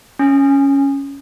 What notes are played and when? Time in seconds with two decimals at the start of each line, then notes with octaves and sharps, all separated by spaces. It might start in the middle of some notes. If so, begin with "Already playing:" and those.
0.19 C#4